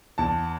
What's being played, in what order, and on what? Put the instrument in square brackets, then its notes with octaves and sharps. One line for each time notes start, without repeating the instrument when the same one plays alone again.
[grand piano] E2 A5